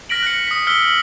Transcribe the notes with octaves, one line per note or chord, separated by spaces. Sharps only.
F6 A#6 B6 D7 F#7
F#6 A#6 C#7
D#6 B6
E6 F6 B6 C#7 G7
F6 B6 F#7